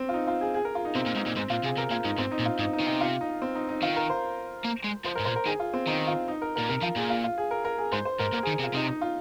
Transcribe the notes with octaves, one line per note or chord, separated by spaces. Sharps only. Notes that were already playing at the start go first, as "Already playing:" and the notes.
Already playing: C4
F4
D#4
F4
G#4
G#4
A#4
F4
D#4
C3 C4
A#2
G#2 D#4
A#2
G#2 C4
A#2 F4
C3 G#4
C3 A#4
A#2 F4
G#2 D#4
G#2 C4
D#4
A#2
F4
G#2 D#4
D#4
D#3
C3 D#4
F4
D#4
C4
D#4
D#4
D#3 F4
A#4
C5
A#3
G#3
F3 C5
A#4
G#2
A#2 C5
A#4
D#3 G#4
F4
C4
D#3 D#4
F4
D#4
A#4
A#2 A#4
C3 A#4
F3 F4
A#2 G#4
F4
F4
G#4
A#4
A#4
G#4
G#2 C5
C5
G#2 A#4
A#2 A#4
G#4
D#3
C3
F4
C3 D#4
D#4
F4